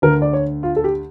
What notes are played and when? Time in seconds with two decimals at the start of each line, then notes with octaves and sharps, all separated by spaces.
0.02 D2 D3 A#4
0.22 D5
0.33 C#5
0.63 F4
0.76 A4
0.84 G4